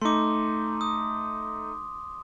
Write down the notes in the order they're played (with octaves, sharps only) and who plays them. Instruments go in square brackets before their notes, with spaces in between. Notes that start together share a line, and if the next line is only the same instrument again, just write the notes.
[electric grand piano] A3 D#4 [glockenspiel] C6 D6
[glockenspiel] D#6